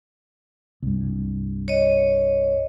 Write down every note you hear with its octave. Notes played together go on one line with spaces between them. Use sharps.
C2 G2
C#5 D#5